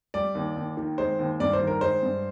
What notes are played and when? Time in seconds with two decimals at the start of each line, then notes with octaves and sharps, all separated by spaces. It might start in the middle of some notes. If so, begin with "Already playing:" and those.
0.14 G3 D5
0.35 D#2
0.56 D#2
0.77 D#3
0.98 G#3 C5
1.19 D#2
1.40 G2 D5
1.53 C5
1.61 D#3
1.67 A#4
1.81 G#3 C5
2.03 G2